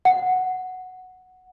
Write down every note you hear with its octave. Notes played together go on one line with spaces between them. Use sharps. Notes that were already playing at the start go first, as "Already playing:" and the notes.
F#5